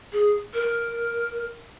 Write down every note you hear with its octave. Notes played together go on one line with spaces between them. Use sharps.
G#4
A#4